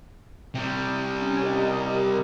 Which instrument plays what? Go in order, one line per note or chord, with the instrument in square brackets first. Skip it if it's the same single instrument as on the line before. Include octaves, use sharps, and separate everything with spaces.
[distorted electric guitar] C3 G3
[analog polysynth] C#4 G#5
G4 A#4 D#5